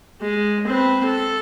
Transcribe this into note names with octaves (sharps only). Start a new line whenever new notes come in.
G#3
C4 B4
A4